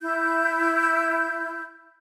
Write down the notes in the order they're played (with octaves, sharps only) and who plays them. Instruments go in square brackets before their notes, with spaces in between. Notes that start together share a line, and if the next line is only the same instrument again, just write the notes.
[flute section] E4 G6